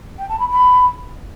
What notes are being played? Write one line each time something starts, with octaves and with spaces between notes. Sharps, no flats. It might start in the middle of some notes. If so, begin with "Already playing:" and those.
G5
A5
B5
B5